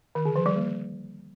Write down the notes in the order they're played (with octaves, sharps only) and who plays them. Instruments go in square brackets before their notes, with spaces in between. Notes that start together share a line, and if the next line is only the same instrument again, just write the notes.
[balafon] D#3
D3
F3
G3
A#3